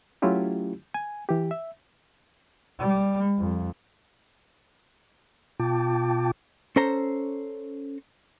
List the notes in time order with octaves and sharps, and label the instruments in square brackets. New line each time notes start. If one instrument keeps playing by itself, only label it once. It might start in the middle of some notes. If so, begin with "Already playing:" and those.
[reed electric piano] F#3 A3 C#4 E4 F4 G4
G#5
E3 G4
E5
[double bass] G3
F2
[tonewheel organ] B2 F4 G5 A5 D6
[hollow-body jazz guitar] C#4 A4 C5 A#5